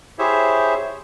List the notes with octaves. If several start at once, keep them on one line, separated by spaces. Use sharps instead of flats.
E4 G4 G#4 C5 C#5 E5